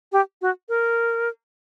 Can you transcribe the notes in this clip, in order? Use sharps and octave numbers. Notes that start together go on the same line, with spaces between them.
G4
F#4
A#4